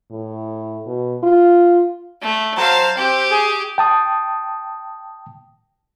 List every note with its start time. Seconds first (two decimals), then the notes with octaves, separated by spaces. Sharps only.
0.11 A2
0.87 B2
1.24 F4
2.22 A3
2.57 F#3 C5 F5 A5
2.97 C4 G4
3.31 G#4
3.78 G5 A5 D#6